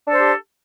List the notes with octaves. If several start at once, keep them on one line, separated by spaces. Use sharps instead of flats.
D4 G4 A4 C5